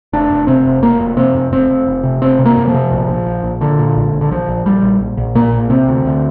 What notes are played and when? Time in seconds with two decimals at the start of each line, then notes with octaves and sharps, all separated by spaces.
0.13 F1 D4
0.31 F1
0.47 C3 C4
0.66 F1
0.82 F1 A#3
1.00 F2
1.17 C3 C4
1.35 F2
1.52 F1 C4
1.70 F1
1.87 F1
2.04 C3
2.22 F1 C4
2.39 C3
2.45 A#3
2.57 F2
2.68 F3
2.74 C3
2.92 A#1
3.09 A#1
3.26 A#1
3.43 A#1
3.61 A#2 D3
3.79 A#2
3.96 A#1
4.13 A#1
4.21 D3
4.31 A#1 F3
4.48 A#1
4.65 A#1 G3
4.82 A#1
5.00 A#1
5.17 A#1
5.35 A#2 A#3
5.52 A#1
5.70 C3 C4
5.87 D2
6.05 D2